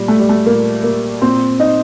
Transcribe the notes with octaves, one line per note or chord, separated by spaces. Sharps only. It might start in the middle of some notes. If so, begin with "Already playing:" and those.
Already playing: A#2 G3
A3
G3
A3
A#2 A#3
A#3
A#2 C4
D#4